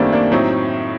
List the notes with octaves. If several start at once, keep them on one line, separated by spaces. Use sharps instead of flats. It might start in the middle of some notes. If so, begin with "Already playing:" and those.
Already playing: F#2 D#3 G3 A3 A#3 C4 D4
A#3 D4
A2 F#3 C4 D#4